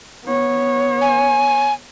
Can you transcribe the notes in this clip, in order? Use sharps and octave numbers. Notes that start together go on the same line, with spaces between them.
B3 C#5
G#5